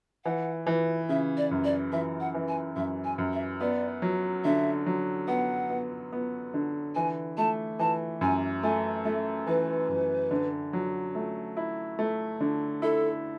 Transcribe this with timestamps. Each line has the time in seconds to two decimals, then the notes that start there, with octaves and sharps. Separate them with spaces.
0.25 E3 F#5
0.67 E3
1.09 C#3 E5
1.37 D5
1.51 F#2
1.64 D5
1.92 E3 E5
2.20 F#5
2.34 E3
2.48 G#5
2.76 F#2 E5
3.04 G#5
3.18 F#2
3.33 E5
3.61 B3 D5
4.02 F#3
4.45 D3 E5
4.86 F#3
5.28 B3 F#5
5.70 B3
6.12 B3
6.54 D3
6.95 E3 G#5
7.38 A3 A5
7.79 E3 A5
8.21 F#2 G#5
8.63 A3 G#5
9.05 A3 E5
9.47 E3 B4
9.89 F#2
10.31 D3
10.73 F#3
11.15 A3
11.57 E4
11.99 A3
12.40 D3
12.82 E4 A4